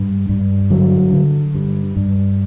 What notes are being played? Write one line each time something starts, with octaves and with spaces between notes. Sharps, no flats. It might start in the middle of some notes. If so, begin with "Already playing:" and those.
Already playing: G2
G2
D3 F#3
D3
G2
G2